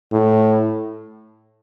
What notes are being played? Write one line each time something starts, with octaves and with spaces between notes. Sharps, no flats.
A2